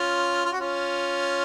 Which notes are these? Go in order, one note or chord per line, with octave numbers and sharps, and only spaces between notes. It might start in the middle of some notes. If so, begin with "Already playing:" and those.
Already playing: C#4 F4
F4
F#4
C#4 F4